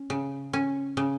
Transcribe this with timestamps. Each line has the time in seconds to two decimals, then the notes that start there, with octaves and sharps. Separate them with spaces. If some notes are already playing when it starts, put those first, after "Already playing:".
Already playing: C#4
0.10 C#3
0.53 C#4
0.97 C#3